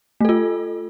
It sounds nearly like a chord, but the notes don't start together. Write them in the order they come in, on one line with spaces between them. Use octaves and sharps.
A3 A4 F4